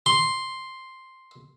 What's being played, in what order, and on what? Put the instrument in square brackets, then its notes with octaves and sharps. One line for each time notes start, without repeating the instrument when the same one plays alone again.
[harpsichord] C6